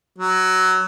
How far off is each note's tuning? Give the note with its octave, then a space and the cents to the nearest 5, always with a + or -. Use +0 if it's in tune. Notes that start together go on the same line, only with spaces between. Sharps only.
F#3 +15